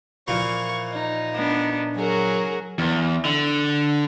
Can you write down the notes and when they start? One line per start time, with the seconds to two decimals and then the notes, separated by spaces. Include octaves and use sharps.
0.28 A#2 E3 F3 C#6
0.92 D#4
1.35 B3 D4
1.96 F#3 F#4 G#4 A#4
2.79 E2
3.25 D3